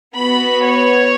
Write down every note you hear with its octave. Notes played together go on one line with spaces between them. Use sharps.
B3 F#4 B5
C#5